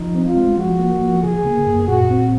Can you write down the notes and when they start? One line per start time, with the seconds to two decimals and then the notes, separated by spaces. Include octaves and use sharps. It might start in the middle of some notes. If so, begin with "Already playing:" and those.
Already playing: F3 D#4
0.15 C4
0.25 F4
0.36 G#3
0.57 F3 F#4
0.79 A#3
1.01 F3
1.23 C#3 G#4
1.45 A#3
1.67 F#2
1.88 A#2 F#4
2.10 C4